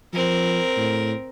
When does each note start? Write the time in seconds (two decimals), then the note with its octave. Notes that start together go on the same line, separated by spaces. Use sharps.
0.13 F3 C4 A#4
0.77 A2